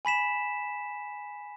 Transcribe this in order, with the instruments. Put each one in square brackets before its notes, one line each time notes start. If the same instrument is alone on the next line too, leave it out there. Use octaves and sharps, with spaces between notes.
[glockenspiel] G#5 B5 B6 E7